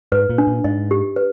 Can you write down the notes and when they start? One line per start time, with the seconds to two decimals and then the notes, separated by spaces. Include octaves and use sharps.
0.12 G#2 B4
0.30 A#2
0.38 D4
0.47 A#2
0.64 G#2 D#5
0.91 G4
1.16 B4